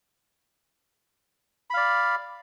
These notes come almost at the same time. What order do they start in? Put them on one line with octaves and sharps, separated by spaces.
B5 F5 D5